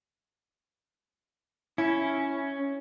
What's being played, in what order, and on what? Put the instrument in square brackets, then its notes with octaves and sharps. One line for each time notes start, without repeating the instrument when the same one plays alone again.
[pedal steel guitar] C#4 [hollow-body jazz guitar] E4